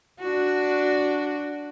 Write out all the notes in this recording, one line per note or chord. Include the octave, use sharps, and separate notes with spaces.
D4 F#4